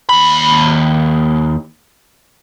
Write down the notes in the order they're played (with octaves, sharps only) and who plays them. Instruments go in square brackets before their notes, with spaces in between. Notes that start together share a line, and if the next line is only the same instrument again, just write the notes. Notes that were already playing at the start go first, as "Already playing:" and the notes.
[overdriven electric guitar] D#2 B5